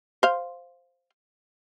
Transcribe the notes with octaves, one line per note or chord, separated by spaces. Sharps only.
C5 F5